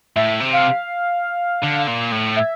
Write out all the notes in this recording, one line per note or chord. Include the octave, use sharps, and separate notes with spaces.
A2 E5
C3
F5
D3
A#2
A2
E5